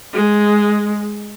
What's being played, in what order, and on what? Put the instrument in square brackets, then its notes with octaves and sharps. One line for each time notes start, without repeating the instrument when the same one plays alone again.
[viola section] G#3